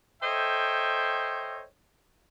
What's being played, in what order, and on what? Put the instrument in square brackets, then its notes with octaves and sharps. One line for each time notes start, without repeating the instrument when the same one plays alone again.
[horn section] A4 C5 C#5 D#5 E5 G5